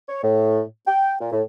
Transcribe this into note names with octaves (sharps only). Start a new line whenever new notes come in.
C#5
A2
G5
A#2
A2